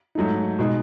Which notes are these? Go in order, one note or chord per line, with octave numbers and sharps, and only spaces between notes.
G#2 F#3 A3 D#4
B2 G#3 D#4